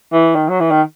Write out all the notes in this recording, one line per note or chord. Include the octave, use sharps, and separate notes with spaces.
E3
D#3
F#3
E3
D#3